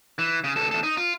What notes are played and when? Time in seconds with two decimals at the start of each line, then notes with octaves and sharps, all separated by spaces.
0.19 E3
0.44 C#3
0.56 C#2 A4
0.71 E2 A4
0.83 D#4
0.97 F4